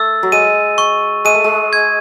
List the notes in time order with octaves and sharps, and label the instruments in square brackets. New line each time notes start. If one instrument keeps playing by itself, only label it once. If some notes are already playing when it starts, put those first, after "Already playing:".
Already playing: [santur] A3 [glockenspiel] E6 A6
[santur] F#3
[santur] G#3 [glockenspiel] D#7
[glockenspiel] C#6
[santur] G#3 [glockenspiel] D#7
[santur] A3
G#3
[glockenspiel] G#6